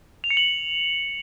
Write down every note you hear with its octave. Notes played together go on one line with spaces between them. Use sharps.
F7
C#7
F#7